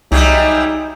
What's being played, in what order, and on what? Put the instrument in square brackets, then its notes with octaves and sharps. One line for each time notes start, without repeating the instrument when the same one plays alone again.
[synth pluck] C2 [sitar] F#3 G3 [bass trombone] D#4 [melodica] G#4 E5 G5